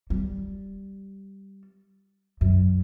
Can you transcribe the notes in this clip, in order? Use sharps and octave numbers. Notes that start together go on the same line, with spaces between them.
G3
F#2